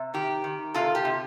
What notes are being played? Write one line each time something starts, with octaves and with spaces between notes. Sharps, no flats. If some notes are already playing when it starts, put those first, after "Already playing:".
Already playing: C3
D#3 G4
D#3
C3 F4 A4
G4
C3